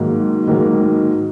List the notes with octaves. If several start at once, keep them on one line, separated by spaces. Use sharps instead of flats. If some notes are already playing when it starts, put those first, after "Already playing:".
Already playing: G#2 D#3 F#3 A#3
G#2 D#3 F#3 A#3